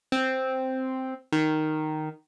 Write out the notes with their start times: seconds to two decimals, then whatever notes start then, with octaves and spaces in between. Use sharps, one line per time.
0.12 C4
1.32 D#3